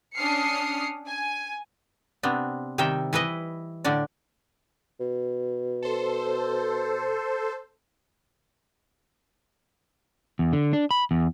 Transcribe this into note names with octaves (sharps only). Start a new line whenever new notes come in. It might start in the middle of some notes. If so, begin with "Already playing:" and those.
C#4 D4 D#6 F6 C7 C#7
G#5
C3 B3 C4 D4
C3 D#3 G3 E5 G5
E3 E4 B4 D#5
A2 D3 D4 D5
B2
A4 C5
E2
D3
D4
B5
E2